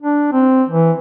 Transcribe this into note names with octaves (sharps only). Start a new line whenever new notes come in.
D4
C4
E3